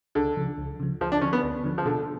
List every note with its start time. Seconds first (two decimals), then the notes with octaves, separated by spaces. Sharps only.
0.15 C#2 D3
0.37 C#3 F3
0.58 C#2
0.80 C#3 F3
1.01 D2 F3
1.12 D4
1.22 D3 F3 C#4
1.33 B3
1.44 D2
1.64 D3 F3
1.78 F3
1.85 B2 D3